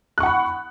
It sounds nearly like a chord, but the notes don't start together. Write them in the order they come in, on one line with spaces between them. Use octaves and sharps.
F#6 C#6 F#5 B5